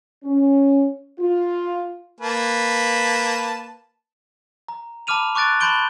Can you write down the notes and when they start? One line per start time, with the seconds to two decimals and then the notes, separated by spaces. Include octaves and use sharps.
0.24 C#4
1.19 F4
2.21 A#3 B4 A5
4.68 A#5
5.07 A5 B5 D6 F6 D#7 F7
5.35 C#6 D6 F#6 A6 D7
5.60 A5 B5 C6 G6 D7 G7